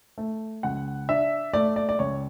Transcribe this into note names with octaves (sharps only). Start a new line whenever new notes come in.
A3
C#2 F#5
D4 E5
A3 D5
D5
D5
C#2 C#5